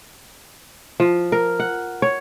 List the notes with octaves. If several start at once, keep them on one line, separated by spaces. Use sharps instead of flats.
F3
A#4
F#5
C#5